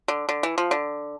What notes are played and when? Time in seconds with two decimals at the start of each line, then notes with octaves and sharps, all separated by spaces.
0.08 D3
0.29 D3
0.43 E3
0.58 F3
0.71 D3